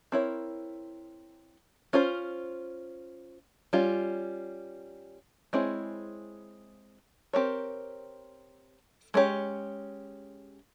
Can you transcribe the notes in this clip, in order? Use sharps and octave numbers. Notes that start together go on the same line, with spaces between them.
C4 E4 A#4 C#5
C#4 F4 C5
G3 C#4 F4
G#3 C4 E4 G#4 C#5
C4 G4 A#4 C#5
G#3 C#4 G4 C#5